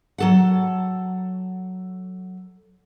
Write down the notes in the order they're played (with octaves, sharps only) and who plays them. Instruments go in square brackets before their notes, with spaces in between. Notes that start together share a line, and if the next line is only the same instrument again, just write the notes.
[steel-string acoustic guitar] F#3 A4 F#5